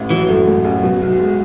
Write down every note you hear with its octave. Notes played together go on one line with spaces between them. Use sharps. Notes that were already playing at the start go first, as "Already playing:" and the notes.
Already playing: A1 A2
E3 F#3
F#2 A3
A2
A1
B2
B1
G#3